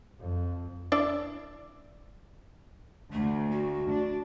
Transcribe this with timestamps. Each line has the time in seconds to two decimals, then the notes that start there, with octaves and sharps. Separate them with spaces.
0.20 F2
0.92 D4 E4 D5
3.12 D2 A3
3.50 F#4
3.91 D4